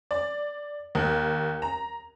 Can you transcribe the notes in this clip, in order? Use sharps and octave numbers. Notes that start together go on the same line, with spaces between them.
D5
D#2
A#5